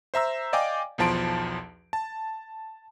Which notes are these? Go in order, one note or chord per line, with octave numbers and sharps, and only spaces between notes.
C5 E5 A#5 E6
D5 D#5 F5 G5 G#5 D6
B1 E2 F3 A5 C6 D7
A5